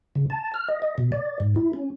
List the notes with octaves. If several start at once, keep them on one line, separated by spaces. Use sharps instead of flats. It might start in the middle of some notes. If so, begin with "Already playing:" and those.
C#3
A5
F6
D#5
D#5
B2
D5
G#2
E4
C#4